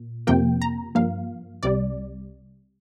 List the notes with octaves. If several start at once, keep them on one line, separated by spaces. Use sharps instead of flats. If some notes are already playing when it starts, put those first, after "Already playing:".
Already playing: A#2
F2 C3 F3 A#3 G5
A#5
G2 F3 A#3 F5
C2 C3 G3 D5